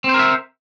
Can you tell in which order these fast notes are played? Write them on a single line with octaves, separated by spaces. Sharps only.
C4 C5 A#4 E5